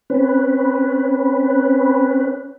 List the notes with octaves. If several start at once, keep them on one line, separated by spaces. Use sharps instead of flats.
C4 C#4 B4